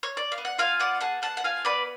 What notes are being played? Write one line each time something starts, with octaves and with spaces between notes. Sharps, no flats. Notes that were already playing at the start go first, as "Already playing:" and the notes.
C#5
D5
F5
B3
F#5
F4 F5 G#5
B3 D5 F#5
G#4 F#5 A5
B3 F#5 A5
F#5
F4 F5 G#5
B3 B4 D5